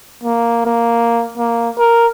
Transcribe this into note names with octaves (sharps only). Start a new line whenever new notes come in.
A#3
A#3
A#3
A#4